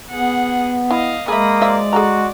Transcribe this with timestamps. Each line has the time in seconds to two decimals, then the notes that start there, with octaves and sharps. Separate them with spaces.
0.10 B3 G#4 F#5
0.91 E4 D#5 F5
1.28 G#3 A#3 G#4 E5 B5 D#6
1.62 F3 F#3 D5 E5
1.93 F#4 G#4 A4 A#5